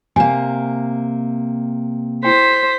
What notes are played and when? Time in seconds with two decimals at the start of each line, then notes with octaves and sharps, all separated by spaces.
0.16 C3 A#3 G#5
2.25 E4 C5 G5 B6